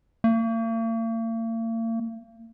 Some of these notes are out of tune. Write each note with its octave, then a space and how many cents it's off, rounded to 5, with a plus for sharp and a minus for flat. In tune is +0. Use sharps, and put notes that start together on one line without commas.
A#3 -45